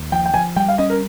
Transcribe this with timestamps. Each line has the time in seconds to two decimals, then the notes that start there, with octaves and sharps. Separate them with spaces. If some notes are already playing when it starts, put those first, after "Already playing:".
Already playing: D#2
0.12 F3 G5
0.26 G5
0.34 F3 G#5
0.56 G3 G5
0.68 F5
0.78 C#4 D#5
0.90 A#4